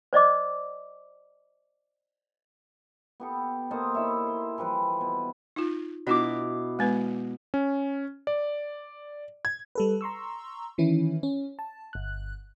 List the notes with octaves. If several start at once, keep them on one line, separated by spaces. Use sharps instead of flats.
C5 D5 D#5 D6
B3 G4 A4
A#3 A4 C5 D#5
D#4 E4 C#5 E5
C6
E3 F3 G3 B4
B2
D#4 F4
B2 D4 E4 F4 D6
G#3 B3 B4
C#4
D5
G#6
G3 A4 B4
A#5 C6 C#6 E6
D#3 E3 C#4 E4
C#4
A5
G1 F#6